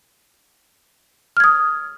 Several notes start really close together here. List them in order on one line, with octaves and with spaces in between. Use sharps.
F6 G#6 D#6